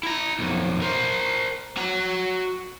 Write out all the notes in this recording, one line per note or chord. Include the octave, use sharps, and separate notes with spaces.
E4 A#5
B1 F2
A#4 C5
F#4 A#5